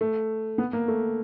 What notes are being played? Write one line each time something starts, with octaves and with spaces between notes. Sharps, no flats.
A3
B3
A#3
A3